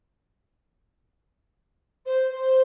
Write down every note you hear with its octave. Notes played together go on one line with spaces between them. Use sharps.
C5
C5